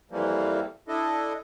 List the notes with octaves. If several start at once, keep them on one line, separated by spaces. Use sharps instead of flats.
F2 E3 F3 G3 A#3
D4 E4 A4 D#5